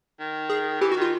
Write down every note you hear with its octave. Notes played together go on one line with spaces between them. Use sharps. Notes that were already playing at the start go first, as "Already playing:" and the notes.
D#3
G#4
E3 G4
F#4
D#3
F4